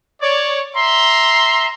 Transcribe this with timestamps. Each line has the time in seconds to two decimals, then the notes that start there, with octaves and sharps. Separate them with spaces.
0.22 C#5 D5
0.77 E5 A#5 C6